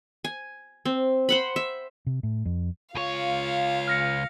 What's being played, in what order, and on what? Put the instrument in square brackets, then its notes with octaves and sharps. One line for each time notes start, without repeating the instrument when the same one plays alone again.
[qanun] G#5
C4
C5 F#5 B5
E5
[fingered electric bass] C3
A2
F2
[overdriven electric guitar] C#2 C#5 [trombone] F4 [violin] F5
[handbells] F6 A#6 C#7